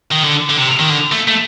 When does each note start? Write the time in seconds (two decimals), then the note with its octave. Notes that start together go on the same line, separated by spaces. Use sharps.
0.12 D#3
0.24 D3
0.50 D3
0.57 C3
0.79 D#3
0.89 D3
1.12 A3
1.28 A3